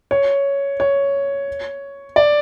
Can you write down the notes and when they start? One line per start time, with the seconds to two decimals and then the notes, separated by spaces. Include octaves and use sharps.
0.11 C#5
0.80 C#5
2.16 D5